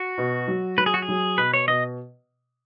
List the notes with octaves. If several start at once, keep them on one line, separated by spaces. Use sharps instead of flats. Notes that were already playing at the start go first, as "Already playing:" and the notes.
Already playing: F#4
B2
F#3
F#3 B4
G#4
F#4
G#4
F#3
B2 B4
C#5
B2 D#5